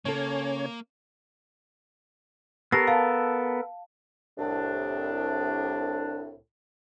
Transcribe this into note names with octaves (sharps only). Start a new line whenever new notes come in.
C#3 A#3 C#4 A4 C#5
B3 G4 A4 A#4 A#6 C7
F5 A5
C2 A2 D4